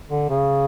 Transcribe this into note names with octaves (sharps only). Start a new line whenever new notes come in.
D3
C#3